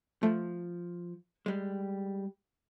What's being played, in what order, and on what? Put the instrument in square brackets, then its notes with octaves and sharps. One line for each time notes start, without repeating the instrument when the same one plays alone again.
[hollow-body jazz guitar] F3 [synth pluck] A3
[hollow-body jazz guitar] G3 G#3